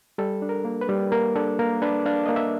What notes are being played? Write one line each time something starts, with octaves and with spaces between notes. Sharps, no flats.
G3 A4
D4
A#4
A#3
B4
G3
A#3 A#4
D4 A4
A#3 A#4
D4 B4
D4 F5
A#3 D#5
E5